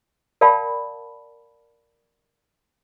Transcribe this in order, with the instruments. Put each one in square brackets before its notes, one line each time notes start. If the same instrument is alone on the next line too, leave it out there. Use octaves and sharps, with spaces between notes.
[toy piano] A#4 D5 F5 G5 A5 B5